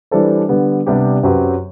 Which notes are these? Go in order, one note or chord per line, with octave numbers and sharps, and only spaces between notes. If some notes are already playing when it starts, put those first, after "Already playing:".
E3 G3 D4 A4 C5
D3 G3 B3
C3 G3 B3 D4 G4
F#2 F#3 C4 G4 B4